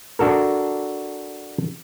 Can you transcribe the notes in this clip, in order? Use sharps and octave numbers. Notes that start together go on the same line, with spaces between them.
D4 F#4 A4 A#4